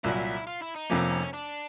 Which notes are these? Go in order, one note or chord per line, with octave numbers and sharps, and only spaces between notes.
C2 A#2 F#3 E4
F4
E4
D#4
F1 F2 C3 F3 A#3 C#4
D4